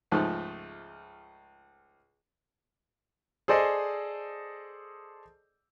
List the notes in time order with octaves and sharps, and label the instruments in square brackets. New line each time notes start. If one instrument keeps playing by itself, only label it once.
[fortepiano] C#2 G#2 F3 A3
[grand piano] G#4 A4 C5 D5 D#5